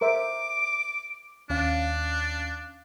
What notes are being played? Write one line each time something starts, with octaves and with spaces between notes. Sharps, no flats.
A#4 C5 E5 D6
D#2 C#4 D4 F5